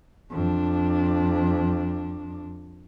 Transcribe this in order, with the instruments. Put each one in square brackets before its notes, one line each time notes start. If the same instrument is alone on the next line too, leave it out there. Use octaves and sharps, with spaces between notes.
[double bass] F2 D4